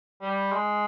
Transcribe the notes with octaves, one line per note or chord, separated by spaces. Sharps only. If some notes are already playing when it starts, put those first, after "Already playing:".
G3
G#3